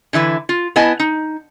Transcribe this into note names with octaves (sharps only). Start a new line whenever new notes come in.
D3 E3 E4 B4
F4
B3 E4 D#5 G#5 A5
D#4